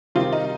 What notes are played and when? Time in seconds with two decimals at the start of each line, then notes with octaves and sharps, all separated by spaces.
0.15 C3 D#3 G3 C4 F4
0.33 D#4